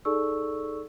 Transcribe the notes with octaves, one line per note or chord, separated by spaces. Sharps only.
D#4 G#4 A4 D5 C#6 E6